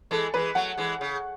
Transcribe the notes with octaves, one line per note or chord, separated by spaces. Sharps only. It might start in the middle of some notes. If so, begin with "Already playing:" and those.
E3 G#3 A4
E3 G#3 B4
F#3 A3 F#5
E3 G#3
C#3